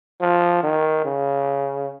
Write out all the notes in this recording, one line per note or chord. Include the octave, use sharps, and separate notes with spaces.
F3
D#3
C#3